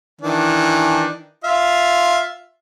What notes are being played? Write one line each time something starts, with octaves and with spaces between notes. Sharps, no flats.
D#3 E3 D4
F4 E5 F5